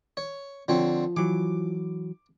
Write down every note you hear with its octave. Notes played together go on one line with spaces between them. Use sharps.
C#5
D3 F3 C4 C#5
E3 F#3 D6